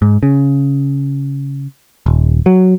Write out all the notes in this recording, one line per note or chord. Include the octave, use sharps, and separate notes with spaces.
G#2
C#3
D#1
F#3